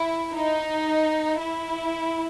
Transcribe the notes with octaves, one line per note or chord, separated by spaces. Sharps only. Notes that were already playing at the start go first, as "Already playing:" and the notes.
Already playing: E4
D#4
E4